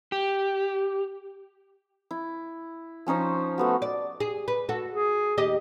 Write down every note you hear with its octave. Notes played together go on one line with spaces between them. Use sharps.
G4
E4
F3 C#4 D#4 C5
A3 B3 F#4
D5
G#4
B4
F#4 A4
G#4
D#2 G4 D#5